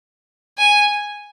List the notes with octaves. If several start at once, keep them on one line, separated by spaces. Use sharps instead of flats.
G#5